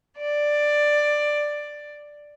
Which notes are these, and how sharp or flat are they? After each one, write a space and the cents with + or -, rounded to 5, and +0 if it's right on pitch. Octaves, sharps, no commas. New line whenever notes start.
D5 +10